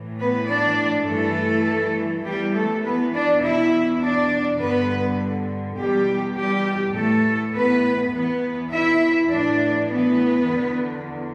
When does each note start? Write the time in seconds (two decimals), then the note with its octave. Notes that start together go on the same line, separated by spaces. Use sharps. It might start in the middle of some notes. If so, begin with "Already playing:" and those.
Already playing: A2 E3
0.19 B3 B4
0.49 D4 D5
1.08 G2 E3 A3 A4
2.25 E2 E3 G3 G4
2.54 A3 A4
2.84 B3 B4
3.14 D4 D5
3.43 E2 B2 E4 E5
4.02 D4 D5
4.61 G2 D3 B3 B4
5.78 E2 B2 G3 G4
6.38 G3 G4
6.96 A2 E3 A3 A4
7.55 B3 B4
8.14 E2 E3 B3 B4
8.73 E4 E5
9.32 A2 E3 D4 D5
9.91 B3 B4
10.50 E2 D3